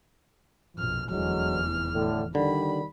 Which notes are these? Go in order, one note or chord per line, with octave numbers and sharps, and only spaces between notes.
A#1 F2 B2 F6
F1 E2 D3 E3 F#3 G#3 F6
A2 D3
D3 D#3 G3 B5